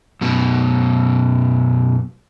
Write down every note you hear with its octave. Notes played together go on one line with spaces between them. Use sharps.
F#2 B2